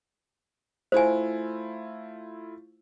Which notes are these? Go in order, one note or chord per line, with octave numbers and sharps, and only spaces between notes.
A3 E4 F4 C5 G#5